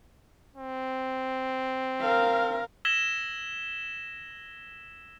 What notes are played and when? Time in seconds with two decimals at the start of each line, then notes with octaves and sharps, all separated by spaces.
0.56 C4
2.01 A#4 F5
2.85 E6 G#6 A#6 B6 E7 G7